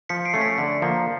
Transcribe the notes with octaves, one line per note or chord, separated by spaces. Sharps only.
F3 B6 C#7
C7 D7
A3 C#4
B6 C#7
D3
F3 A#3